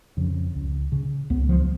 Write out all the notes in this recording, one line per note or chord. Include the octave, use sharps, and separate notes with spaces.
F2 C#3
C#2
C#3
C#2 B3
F3